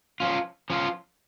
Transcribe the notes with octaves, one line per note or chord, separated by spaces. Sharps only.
F3 C#4 F4
F3 C#4 F4